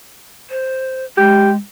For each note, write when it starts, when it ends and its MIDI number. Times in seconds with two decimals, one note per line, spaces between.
0.50 1.05 72
1.17 1.56 56
1.17 1.51 67